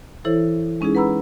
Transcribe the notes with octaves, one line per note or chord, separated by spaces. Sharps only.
E3 E4 A4 C5 C#5
G#3 C#4 D#4 E4 G#4
B4 F#5 A#5 B5 E6